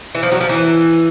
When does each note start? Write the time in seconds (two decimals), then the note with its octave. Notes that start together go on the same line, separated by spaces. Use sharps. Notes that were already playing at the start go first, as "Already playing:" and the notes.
0.15 E3
0.23 F3
0.32 F#3
0.40 F3
0.49 E3